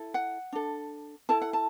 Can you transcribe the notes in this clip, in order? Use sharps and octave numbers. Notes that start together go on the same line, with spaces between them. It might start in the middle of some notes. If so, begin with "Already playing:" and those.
Already playing: E4 A4
F#5
D4 A4
E4 A4 A5
F#5
A5